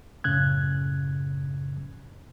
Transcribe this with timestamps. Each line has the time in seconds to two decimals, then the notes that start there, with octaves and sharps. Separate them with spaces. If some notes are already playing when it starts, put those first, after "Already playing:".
0.24 F#2 A2 C#3 F#6 G#6